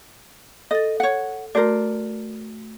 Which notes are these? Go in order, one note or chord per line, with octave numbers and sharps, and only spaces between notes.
A4 D#5 A6
C#5 F#5
A3 F#4 A#4 C5 D5